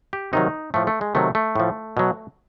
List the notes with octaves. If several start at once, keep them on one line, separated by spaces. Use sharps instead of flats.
G4
C3 D#3 F#3 D#4
A2 F3 A3
A3
G#3
C3 D#3 F#3 A3
A3
A2 F3
B2 F#3